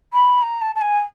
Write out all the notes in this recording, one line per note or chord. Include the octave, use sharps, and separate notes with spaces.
B5
A#5
A5
A5
G#5